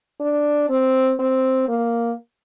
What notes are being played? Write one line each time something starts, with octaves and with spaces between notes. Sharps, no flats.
D4
C4
C4
A#3